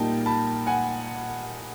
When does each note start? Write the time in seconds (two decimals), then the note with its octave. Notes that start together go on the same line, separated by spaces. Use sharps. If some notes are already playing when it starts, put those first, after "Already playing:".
Already playing: A#2 G3 A#3 D#4 G5 A5
0.26 A5 B5
0.67 F#5 G#5